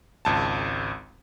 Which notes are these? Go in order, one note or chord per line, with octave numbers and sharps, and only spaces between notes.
G#1 C#2 A5